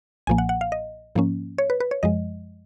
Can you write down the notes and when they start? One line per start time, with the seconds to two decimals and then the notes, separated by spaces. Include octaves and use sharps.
0.27 B1 A#2 F3 A#3 G#5
0.38 F#5
0.49 F#5
0.61 F5
0.72 D#5
1.15 G#2 F3 A#3 C#4
1.58 C#5
1.70 B4
1.80 B4
1.91 C#5
2.03 F#2 F3 G#3 D#5